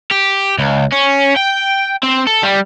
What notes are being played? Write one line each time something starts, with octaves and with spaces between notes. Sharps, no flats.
G4
C#2
C#4
G5
C4
A4
G3